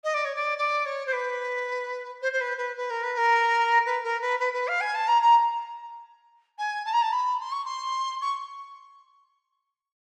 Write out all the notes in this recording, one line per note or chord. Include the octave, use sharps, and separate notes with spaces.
D#5
D5
C#5
D5
D5
C#5
C5
B4
C5
C5
B4
B4
B4
A#4
B4
A#4
B4
A#4
B4
B4
B4
F5
G#5
A5
A#5
A#5
G#5
A5
A#5
A5
B5
C6
C#6
C6
C#6